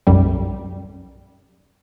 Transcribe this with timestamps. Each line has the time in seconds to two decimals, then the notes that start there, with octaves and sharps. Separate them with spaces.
0.07 B1 F#2 G3